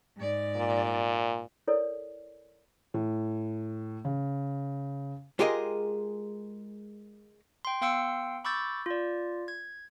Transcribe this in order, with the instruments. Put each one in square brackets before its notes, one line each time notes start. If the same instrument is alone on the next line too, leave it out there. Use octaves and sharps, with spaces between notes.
[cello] G#2 D5
[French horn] A#2
[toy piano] E4 A4 A#4 C#5 D5
[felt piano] A2
C#3
[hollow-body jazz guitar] G#3 F4 G4 G#4 A#4 D#5
[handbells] G5 C6
B3 F5 G5 C6 E6 C#7
B5 C#6 D6 E6 G6 A6
F4 D5
G#6